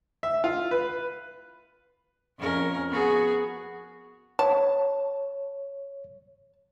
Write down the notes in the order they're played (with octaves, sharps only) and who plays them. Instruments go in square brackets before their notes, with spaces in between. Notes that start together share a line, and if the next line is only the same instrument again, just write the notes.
[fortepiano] E5
F4
B4
[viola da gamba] F2 C#4 A#4
B3 F#4 G#4
[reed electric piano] C#5 [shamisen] A5